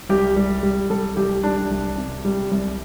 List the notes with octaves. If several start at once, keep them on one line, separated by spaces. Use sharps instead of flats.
C2 G4
G3
G3
C2 A4
C2 G4
G3 D4
C2
C3
G3
C2